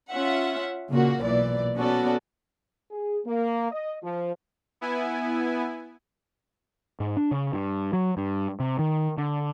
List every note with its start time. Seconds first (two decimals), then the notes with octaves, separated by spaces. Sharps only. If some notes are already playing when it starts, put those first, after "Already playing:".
0.11 C#4 F4 E5 F#5
0.90 A#2 C#3 A#3 F#4
1.23 B1 A#2 E3 D5
1.75 B3 C#4 F#4 A4 D5
2.91 G#4
3.26 A#3
3.71 D#5
4.03 F3
4.81 B3 E4 G#5
7.00 G#2
7.17 D4
7.31 C#3
7.53 G2
7.93 F#3
8.17 G2
8.60 C3
8.79 D#3
9.17 D3